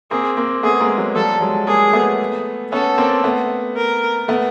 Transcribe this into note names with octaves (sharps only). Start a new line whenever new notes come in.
A#3 C4 G#4
A#3 C4
A3 B3 G#4
G#3 A#3
F#3 G#3
F3 G3 A4
F#3 G#3
G#3 A#3 G#4
A3 B3
B3 C#4 A4
A#3 C4
A3 B3
A#4
A3 B3